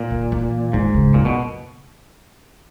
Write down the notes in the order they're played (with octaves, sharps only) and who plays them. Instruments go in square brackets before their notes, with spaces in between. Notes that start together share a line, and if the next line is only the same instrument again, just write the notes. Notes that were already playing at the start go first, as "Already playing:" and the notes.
Already playing: [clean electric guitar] A#2
[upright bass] D#3
E3
[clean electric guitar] G#2 [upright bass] D#3
[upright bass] C#3
[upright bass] F#2 [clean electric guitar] A#2
[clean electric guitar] B2